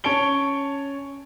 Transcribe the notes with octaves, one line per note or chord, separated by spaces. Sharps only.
C#4 C#5 A5 D7 G7